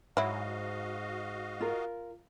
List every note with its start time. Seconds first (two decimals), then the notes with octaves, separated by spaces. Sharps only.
0.17 G#2 F#3 E4 F#4 D#5 F5
1.61 F4 A#4